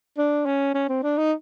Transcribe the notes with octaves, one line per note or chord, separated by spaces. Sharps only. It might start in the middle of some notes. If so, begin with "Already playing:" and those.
D4
C#4
C#4
C4
D4
D#4